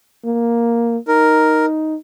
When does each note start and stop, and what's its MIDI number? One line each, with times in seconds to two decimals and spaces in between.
0.25 0.98 58
1.08 1.96 63
1.08 1.66 70